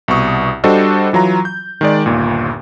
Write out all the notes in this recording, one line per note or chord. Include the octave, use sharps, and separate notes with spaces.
C2 B2 C#6 D#6
G3 D4 F#4 A4 C5 D#5
E3 F#3 F4 A#5
G6
D#3 G#3 D5
G1 D#2 A#2